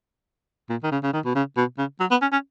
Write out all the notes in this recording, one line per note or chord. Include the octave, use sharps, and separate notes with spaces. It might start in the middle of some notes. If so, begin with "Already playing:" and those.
A#2
D#3
C#3
C#3
D#3
B2
C#3
B2
C#3
F#3
B3
C#4
C#4